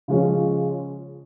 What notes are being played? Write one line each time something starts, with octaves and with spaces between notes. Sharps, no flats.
C#3 F3 G#3 C#4